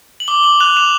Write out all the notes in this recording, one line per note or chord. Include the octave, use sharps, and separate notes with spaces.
F#7
D6 G7
D6 F#7
F#6 F7
D6 E7